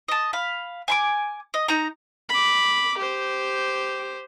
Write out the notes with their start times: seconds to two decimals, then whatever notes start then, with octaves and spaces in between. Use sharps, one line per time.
0.08 D#5 A5
0.33 F5 B5
0.88 G#5 B5 D6
1.54 D#5
1.68 D#4 A#5
2.29 B5 D6
2.97 G4 C5